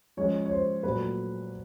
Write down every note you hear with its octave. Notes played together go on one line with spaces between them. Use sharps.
F3 G#3 C#4 C#5
C#5
C5
A#2 F#3 A3 B4